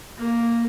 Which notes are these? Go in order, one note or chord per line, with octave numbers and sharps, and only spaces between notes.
A#3